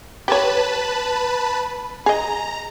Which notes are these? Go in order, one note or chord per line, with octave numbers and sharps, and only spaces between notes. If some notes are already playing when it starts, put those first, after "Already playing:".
G4 B4 C#5 A5 B5
G#4 D#5 A#5